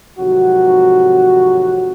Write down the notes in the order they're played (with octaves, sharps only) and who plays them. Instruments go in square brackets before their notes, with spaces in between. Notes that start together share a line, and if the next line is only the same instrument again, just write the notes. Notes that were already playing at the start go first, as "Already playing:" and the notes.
[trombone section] F2 G#2 C3 D#3 F#3 F#4